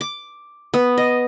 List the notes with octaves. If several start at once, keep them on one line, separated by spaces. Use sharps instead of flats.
D6
B3
D#5